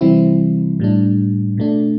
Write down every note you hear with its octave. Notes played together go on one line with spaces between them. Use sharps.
C3 E3 G3 C4 E4
A2 G3 D4
B2 A3 D4